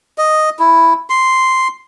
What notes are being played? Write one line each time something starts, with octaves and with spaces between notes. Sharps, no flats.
D#5
E4
C6